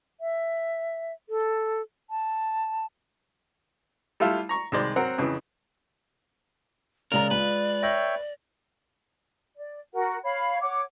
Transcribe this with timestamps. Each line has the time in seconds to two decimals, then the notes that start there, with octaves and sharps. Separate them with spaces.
0.21 E5
1.29 A4
2.10 A5
4.20 G3 A3 E4 F4
4.49 A#5 C#6
4.72 C2 D#3 G#3 C5 D5
4.96 F#3 C4 A#4 F#5
5.18 F2 C#3 E3
7.12 C#3 G#3 A#4 D5 A#5
7.31 G#3 F4 B4
7.83 C#5 E5 G5 A#6
9.56 D5
9.94 F#4 A#4 F#5
10.23 C#5 F5 B5
10.61 C#5 F#5 D6